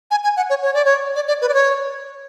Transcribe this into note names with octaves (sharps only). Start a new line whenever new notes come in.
G#5
G#5
F#5
C#5
C#5
D5
C#5
D5
D5
B4
D5
C#5